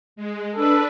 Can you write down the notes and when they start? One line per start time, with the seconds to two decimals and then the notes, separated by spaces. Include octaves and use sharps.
0.16 G#3
0.55 D4 A4 B4